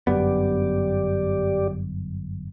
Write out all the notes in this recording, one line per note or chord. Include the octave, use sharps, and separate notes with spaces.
G1 F#2 B3 G4 D5